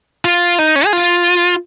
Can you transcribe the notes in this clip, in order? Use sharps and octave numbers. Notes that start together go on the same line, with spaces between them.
F4
D#4
C#4
G#4
F4